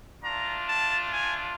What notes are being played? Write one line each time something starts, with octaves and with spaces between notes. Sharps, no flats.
A3 D4 F4 A#5
A5
G#5